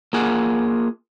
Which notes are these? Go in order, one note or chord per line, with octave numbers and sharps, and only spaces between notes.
A#3 F4 G#4 F#5